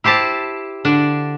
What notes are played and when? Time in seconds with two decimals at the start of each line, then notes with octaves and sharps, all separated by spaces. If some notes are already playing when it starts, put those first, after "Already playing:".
0.04 E4 G4 C5 A5
0.85 D3 D4